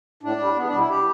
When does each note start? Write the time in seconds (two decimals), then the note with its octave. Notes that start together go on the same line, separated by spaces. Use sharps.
0.23 A2 D4
0.39 G3
0.56 E2 B3
0.67 D4
0.72 B2 G3
0.78 E4
0.89 G4